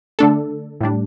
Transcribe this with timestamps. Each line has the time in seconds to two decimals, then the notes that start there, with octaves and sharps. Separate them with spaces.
0.19 D3 A3 D4 A4
0.81 A2 G3 D4